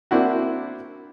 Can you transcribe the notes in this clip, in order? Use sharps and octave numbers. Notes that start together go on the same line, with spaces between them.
A#3 C4 D4 E4 F#4